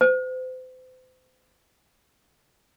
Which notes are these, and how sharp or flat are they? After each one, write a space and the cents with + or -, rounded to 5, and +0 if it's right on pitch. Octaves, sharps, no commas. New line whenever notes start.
C5 -35